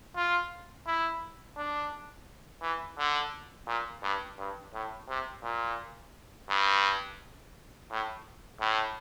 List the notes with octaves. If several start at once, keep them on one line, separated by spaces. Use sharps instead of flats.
F4
E4
D4
E3
D3
A#2
G2
G2
A2
C3
A#2
G2
A2
A2